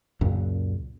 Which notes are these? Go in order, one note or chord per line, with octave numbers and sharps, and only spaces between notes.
C#2 F#2 A#2 C#3